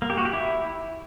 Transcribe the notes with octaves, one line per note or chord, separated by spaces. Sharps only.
A#3
G4
F#4
G4
E4